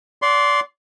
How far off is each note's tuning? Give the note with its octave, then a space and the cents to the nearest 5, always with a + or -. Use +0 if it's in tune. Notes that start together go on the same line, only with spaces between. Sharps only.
D5 -25 F#5 +5 C6 +0